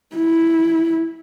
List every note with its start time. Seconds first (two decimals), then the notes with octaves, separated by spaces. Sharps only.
0.16 E4